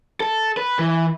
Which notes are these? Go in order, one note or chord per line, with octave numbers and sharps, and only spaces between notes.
A4
B4
E3